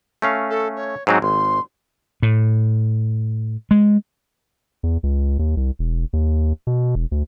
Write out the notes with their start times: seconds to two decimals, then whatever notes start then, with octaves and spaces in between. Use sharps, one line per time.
0.22 A3 C#4 F5
0.50 A4
0.76 C#5
1.07 G#2 F#3 C4 F#5
1.22 G#1 C6
2.22 A2
3.71 G#3
4.83 E2
5.03 C#2
5.39 D#2
5.57 C2
5.79 E1
6.13 D#2
6.67 B2
6.95 E1
7.11 D2